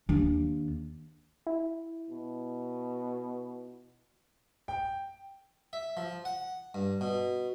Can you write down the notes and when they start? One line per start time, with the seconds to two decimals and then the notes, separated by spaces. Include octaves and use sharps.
0.09 D#2 D4
1.47 E4
2.10 B2
4.68 G5
5.73 E5
5.97 F3
6.25 F#5
6.74 G2
7.01 B2